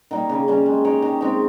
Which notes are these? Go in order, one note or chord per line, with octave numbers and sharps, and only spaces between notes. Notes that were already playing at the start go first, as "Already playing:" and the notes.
D#3 G3 A#3
C#3
G3 C#4
G#3
D#4 G4 C#5
D#3
G#3 C4 D#4